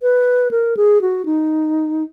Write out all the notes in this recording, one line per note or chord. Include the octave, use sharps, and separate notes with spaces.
B4
A#4
G#4
F#4
D#4